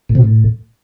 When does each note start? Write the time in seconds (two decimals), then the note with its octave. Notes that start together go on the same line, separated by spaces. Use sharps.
0.09 A2
0.15 C3
0.21 A2